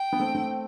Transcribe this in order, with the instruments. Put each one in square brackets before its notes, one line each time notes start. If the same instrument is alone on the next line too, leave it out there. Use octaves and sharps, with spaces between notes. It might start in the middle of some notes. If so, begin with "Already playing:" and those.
Already playing: [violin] G5
[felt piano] B3
A3 C4
A3 C4